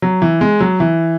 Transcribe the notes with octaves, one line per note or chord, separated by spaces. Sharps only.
F#3
E3
G#3
F#3
E3